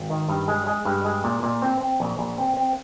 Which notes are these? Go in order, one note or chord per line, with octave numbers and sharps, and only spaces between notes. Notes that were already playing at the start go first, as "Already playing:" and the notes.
Already playing: G#1
D#3
G2
G#3
G#3
G2
G#3
A#2
A#2
C4
C4
A#1
A#1
C4
C4